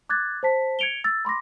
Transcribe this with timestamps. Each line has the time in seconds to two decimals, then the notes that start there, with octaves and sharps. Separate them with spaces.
0.09 D6 F#6 G#6 A6
0.43 C5 A5 B6
0.79 G#6 C#7 D7 F7 G7
1.04 E6 A6
1.25 B5 C6 D6 A#6